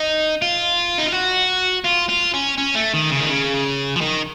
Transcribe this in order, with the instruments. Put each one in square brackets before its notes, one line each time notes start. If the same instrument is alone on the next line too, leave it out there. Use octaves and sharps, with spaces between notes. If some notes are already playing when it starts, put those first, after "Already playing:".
Already playing: [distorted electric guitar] D#4
F4
D#4
F4
F#4
F4
F4
C#4
C#4
A3
D#3
C#3
D#3
C#3
F3
D#3